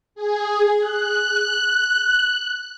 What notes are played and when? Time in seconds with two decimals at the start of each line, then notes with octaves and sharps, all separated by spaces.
0.15 G#4
0.80 F#6